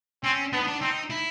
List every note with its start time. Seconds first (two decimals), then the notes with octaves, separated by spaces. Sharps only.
0.24 C4 C#4
0.53 B3 D4
0.60 D#4
0.67 D4
0.81 C4 D#4
1.10 E4